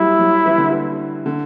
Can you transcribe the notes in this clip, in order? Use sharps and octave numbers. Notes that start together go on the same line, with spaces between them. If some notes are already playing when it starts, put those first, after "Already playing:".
Already playing: F#3 G3 A3 E4
F#3
E3
D3
E3
D3